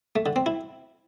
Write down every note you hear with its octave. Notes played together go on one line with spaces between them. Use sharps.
A3
D3
C4
E4